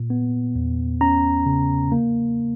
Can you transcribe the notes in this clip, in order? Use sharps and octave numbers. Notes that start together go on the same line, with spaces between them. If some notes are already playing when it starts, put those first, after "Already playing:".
Already playing: A#2
B3
E2
C#4 A#5
C#3
A#3